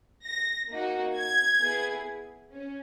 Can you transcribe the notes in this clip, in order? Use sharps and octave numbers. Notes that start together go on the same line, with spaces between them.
A#6
A#3 D#4 F#4
G#6
B3 E4 G#4
C#4